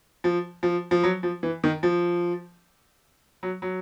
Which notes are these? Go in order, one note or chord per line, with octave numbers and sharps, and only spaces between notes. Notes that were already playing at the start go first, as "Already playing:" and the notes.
F3
F3
F3
F#3
F3
E3
D#3
F3
F#3
F#3